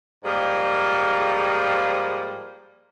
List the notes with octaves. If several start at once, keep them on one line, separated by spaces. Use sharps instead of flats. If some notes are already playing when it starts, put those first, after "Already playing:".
G#2 F3 G3 A#3 G#4